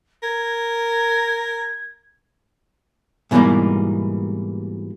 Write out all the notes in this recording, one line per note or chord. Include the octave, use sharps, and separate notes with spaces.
A#4 G#6
G#2 B2 E3 F#3 G3 A#3